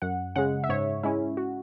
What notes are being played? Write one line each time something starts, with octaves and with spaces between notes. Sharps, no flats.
F#2 F#5
C#3 G#3 F#5
E5
G#2 C#5
G#3 C#4 E4
F#4